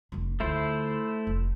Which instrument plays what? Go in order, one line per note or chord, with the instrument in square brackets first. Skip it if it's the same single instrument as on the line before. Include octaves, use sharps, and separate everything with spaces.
[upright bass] F1 D4
[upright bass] D2 F4 [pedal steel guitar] A3 E4 C5
[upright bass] F1